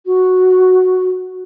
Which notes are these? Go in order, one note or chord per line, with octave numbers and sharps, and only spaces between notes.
F#4